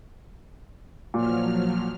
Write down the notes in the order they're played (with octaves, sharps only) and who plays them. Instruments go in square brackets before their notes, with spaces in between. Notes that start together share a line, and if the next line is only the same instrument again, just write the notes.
[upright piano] A#2 [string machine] F3 F#3 F6